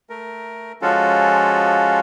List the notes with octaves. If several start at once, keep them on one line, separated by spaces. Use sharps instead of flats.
A3 A#4
F3 G#3 C#4 F4 F#4 A4